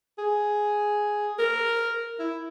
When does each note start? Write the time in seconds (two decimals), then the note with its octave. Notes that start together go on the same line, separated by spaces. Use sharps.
0.18 G#4
1.39 A#4
2.19 E4